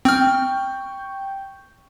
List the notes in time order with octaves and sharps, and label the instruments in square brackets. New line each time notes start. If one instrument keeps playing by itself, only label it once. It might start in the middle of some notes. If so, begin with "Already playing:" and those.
[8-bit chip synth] C4 F6 [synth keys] G5 C#6 G6